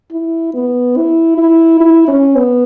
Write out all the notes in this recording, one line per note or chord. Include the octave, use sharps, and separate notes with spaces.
E4
B3
E4
E4
E4
C#4
B3